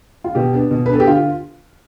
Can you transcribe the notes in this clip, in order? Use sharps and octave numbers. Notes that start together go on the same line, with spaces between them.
F4
B2 G4
B3 D4
B2
B4
B3 D4 A4
G4
D3 F4